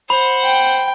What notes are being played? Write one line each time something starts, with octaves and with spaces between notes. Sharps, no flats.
C5 F#5 B5
G5